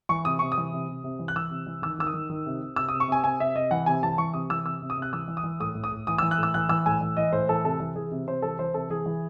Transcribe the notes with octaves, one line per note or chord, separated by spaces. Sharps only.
E3 C#6
C3 D#6
C3 C#6
D#6
E3
C3
C3
C3
E3
F#6
E3 E6
C3
E3
D#3 E6
D#3 E6
D#6
D#3
D#3
C3
C3
C3 E6
C3 D#6
C#6
C3 G#5
C3 G#5
C3 E5
C3 D#5
E3 F#5
C3 G#5
E3 A5
E3 C#6
C3 D#6
E3 E6
C3 E6
C3
D#6
C3
F#6
E3 E6
E3
D#6
E3
A2 D#6
A2
D#6
A2
E3 D#6
E3 E6
F#6
A2 E6
E3 F#6
E3 E6
A2 G#5
E3
E3 D#5
A2 C5
E3 A4
C3 A4
E3
E3 G#4
C3
C3 C5
E3 A4
E3 C5
C3 A4
E3 G#4
E3